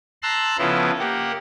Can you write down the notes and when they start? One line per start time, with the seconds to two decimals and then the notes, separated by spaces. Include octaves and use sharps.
0.23 A5 A#5 C6 E6 F#6
0.58 C#3 F3 B3 E4 A4
0.99 A#3 G4 F#5